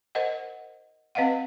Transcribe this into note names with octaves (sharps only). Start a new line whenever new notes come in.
A#4 C5 D#5 F#5
C4 B4 D#5 F5 F#5